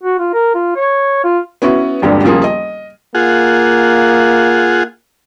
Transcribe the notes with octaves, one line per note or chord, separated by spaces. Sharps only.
F#4
F4
A#4
F4
C#5
F4
B3 C#4 E4 F#4
D#1 G#1 G2 D3 G3
D#1 C#3 F3 A#3 G#4
D#5
A#3 F4 G#4 F#5